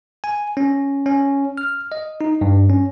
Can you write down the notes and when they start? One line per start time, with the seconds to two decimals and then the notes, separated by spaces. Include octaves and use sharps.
0.24 G#5
0.57 C#4
1.06 C#4
1.58 F6
1.92 D#5
2.21 D#4
2.41 G2
2.70 C#4